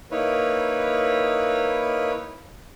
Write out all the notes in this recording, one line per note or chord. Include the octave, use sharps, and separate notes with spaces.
A#3 D#4 E4 B4 C#5